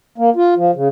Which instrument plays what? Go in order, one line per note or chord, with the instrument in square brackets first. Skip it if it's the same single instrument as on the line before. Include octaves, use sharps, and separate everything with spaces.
[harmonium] A#3
F4
F3
C#3